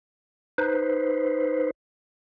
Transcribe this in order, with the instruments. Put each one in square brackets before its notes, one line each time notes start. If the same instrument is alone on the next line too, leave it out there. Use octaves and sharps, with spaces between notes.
[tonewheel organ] D#4 B4 C5